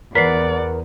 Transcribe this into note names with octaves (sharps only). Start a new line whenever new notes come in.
E2 A#4 B4 D5 F#5 B6 C7